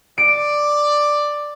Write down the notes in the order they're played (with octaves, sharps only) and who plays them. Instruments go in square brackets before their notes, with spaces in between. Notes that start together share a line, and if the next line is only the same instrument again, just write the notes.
[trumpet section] D5 [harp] D7